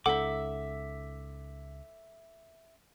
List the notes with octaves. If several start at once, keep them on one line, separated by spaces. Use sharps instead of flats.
C#2 D#4 F4 A4 E5 F#5 D6